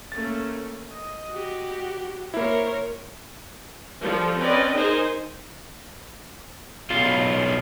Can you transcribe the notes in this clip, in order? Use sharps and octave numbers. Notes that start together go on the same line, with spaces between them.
A3 A#3 C#4 A6
D#5
F#4 G4
A#3 E4 A#4 C5 C#5
F3 G3 A4
C4 C#4 B4 D5 D#5
D#4 G#4 A#4 C5 G#5
B1 F4